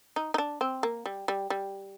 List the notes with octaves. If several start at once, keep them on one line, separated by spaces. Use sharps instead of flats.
D#4
D#4
D4
C4
A#3
G3
G3
G3